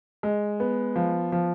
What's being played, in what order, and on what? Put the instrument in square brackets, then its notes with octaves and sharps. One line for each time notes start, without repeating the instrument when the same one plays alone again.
[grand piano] G#3
B3
F3
F3